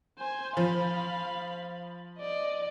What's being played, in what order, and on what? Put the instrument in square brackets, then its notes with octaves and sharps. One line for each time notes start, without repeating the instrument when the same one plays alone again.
[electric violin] C5 G#5
[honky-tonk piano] F3 [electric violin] F5 B5
[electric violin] D5 D#5